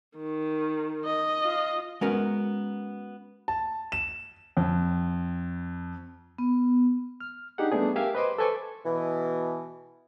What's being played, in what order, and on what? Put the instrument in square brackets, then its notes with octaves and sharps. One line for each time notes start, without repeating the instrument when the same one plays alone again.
[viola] D#3
[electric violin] D#5
[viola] F4
[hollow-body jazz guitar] G#3 B3 C#4 F#4 A#4
[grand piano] A5
E7
F2
[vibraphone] B3
[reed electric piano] F6
D4 D#4 G4 G#4 F#5
G3 A3 B3 D4 G#4
G4 A#4 E5 F5 G5 G#5
B4 C5 D#5 B5 C6 D6
A4 B4 C5 G#5 C#6 D6
[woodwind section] B2 E3